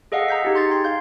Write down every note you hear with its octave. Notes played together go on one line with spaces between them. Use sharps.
G#4 A4 D#5 F5 F#5
A#5 G6 B6
D#4 G4 G#4
C6 G#6 A6
G5 C6
F5 G6